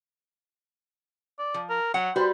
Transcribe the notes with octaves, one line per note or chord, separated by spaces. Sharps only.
D5
F3
A#4
F#3 F#5
G3 F#4 B4 C5